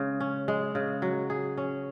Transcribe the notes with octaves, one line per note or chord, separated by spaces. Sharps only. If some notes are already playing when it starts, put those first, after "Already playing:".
Already playing: C#3 G#3
C#4
G#3
C#3
F#3
G#4
C#4